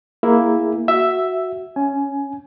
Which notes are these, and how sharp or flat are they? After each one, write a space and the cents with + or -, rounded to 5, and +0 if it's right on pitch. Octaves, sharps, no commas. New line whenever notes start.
A#3 +5 E4 +0 G#4 -5
F#4 +0 E5 +0
C#4 +0 G#5 +15